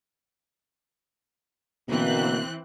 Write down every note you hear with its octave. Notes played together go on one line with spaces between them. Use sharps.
B2 D3 E3 A#3 C4 F#6